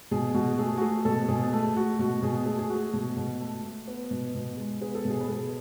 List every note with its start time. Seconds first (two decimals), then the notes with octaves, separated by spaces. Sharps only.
0.11 B2 G#4
0.34 B2 F#4
0.58 A3 G#4
0.77 F#4
0.81 A3 G#4
1.05 B2 A4
1.28 B2 G#4
1.53 A3
1.76 A3 F#4
1.99 B2 F#4
2.22 B2 G#4
2.46 A3 G#4
2.59 G#4
2.70 A3 F#4
2.93 B2
3.17 B2
3.40 A3
3.64 A3
3.87 B3
4.11 B2
4.35 B2
4.57 G#3
4.81 B3 G#4
4.95 A4
5.05 B2 G#4
5.20 B4
5.28 B2 A4